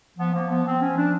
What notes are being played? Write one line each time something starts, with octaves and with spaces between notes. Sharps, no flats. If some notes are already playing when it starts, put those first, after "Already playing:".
F3 B3
F3 A#3
F3 B3
F3 C4
F3 C#4
F3 D4